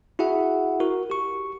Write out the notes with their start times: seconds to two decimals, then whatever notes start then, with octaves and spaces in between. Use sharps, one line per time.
0.19 E4 F#4 G#4 E5 F#5
0.80 F#4 A#4
1.10 G4 C#6